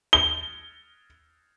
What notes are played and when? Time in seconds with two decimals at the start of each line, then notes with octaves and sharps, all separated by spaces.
0.13 G7